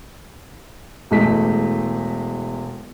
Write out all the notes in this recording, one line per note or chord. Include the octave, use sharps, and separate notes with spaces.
E1 E3 G#3 A3 B6